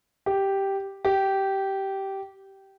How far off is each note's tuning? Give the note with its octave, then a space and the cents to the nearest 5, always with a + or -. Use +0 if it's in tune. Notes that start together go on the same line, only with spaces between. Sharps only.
G4 -5
G4 -15